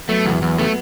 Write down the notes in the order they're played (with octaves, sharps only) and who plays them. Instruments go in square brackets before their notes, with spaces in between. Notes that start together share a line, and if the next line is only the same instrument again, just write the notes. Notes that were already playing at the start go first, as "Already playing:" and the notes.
[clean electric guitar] F#3 B3 [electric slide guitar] A3
[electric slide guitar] E2
E2
[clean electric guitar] F#3 B3 [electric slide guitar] A3